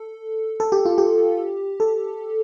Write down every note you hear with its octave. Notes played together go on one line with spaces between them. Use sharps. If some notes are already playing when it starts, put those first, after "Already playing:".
Already playing: A4
A4
G4
F4
G4
A4